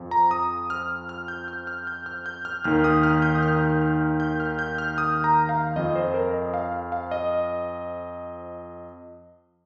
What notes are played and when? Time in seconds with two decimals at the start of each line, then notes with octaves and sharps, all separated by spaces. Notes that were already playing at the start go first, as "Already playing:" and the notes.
Already playing: F2 F3
0.11 A#5
0.31 D#6
0.70 F6
1.09 F6
1.28 G6
1.48 F6
1.67 F6
1.87 G6
2.06 F6
2.26 G6
2.45 F6
2.64 D#2 D#3 F6
2.84 D#6
3.03 F6
3.22 G6
3.35 D#6
3.42 F6
3.81 F6
4.20 G6
4.40 F6
4.59 G6
4.78 F6
4.98 D#6
5.24 A#5
5.49 F5
5.76 F2 F3 D#5
5.95 C5
6.14 A#4
6.34 D#5
6.54 F5
6.92 F5
7.11 D#5